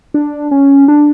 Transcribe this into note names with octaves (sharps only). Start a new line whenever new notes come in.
D4
C#4
D4